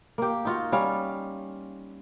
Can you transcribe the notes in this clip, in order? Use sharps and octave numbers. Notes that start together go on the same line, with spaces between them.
A#3 G4
D#4 F4 F#4
G3 C#4 F5